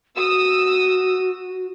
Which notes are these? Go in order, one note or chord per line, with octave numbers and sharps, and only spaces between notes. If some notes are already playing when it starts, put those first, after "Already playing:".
F#4 D#6 E6